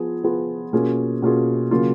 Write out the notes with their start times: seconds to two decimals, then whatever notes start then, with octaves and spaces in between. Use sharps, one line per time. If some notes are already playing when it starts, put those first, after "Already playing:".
Already playing: F3 B3 F4 G#4
0.24 F3 B3 F4 G#4
0.73 B2 A#3 C#4 F4 G#4
1.22 B2 A#3 C#4 F4 G#4
1.71 C#3 F#3 A#3 F4